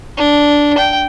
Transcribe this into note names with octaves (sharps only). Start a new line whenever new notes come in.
D4
G5